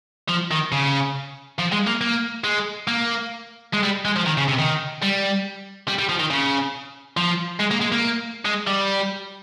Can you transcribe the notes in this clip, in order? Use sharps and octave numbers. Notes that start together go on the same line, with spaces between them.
F3
D#3
C#3
F3
G#3
A#3
A#3
G#3
A#3
G#3
G3
G#3
F3
D#3
C#3
C3
D#3
G3
G3
G3
F3
D#3
C#3
F3
G#3
A#3
G#3
A#3
G#3
G3